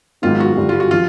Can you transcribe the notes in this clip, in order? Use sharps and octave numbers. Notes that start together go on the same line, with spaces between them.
G#2 D#3 F#3 B3 F4
F#4
G2 D3 G3
F4
F#4
F3 F4